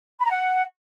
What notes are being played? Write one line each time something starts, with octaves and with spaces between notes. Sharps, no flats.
B5
A#5
F#5